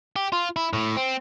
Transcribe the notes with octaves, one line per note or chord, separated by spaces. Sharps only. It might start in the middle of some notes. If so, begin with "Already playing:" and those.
G4
F4
E4
A2
C4